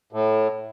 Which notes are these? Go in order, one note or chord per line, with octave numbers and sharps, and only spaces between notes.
A2